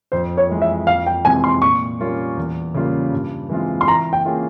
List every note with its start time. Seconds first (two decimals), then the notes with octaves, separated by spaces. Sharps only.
0.12 F2 C5
0.37 C#5
0.49 E3 G#3 E4
0.62 E5
0.87 F2 F5
1.07 G5
1.25 C3 E3 G#3 C4 G#5
1.44 C6
1.62 A#2 C#6
2.00 G3 A#3 C#4 F4
2.37 E2
2.74 C#3 G3 A#3 F4
3.12 G2
3.49 E3 G#3 C4 F4
3.81 C6
3.87 E3 A#5
4.13 G5
4.25 A#3 C#4 F4 G#4